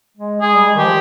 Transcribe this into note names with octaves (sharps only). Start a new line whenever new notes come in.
G#3
G#3 G#4
G3
G#3
D#3
F3 G4